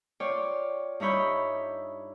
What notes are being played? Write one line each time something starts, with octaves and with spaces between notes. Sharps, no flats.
F4 C#5 D5 G5
G2 D#4 E4 C#5 B5 G6